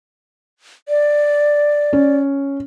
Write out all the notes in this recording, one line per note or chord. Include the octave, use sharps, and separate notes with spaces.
D5
C#4